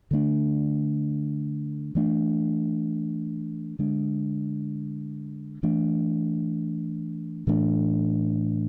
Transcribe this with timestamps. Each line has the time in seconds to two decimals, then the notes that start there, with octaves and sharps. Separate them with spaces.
0.11 D3 A3 D4
1.95 E3 A3 D4
3.79 D3 G#3 D4
5.63 E3 A3 D4
7.47 A2 E3 A3 D4